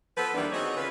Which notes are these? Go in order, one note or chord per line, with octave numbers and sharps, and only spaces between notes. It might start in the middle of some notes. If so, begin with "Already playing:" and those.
F3 B3 A4 B4
E2 D#3 E3 G3 A#3 D4
C4 D#4 F#4 G#4 C#5 D#5
C#3 B3 F4 B4